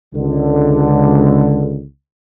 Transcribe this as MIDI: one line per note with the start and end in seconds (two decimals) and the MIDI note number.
0.14 1.84 37
0.14 1.84 50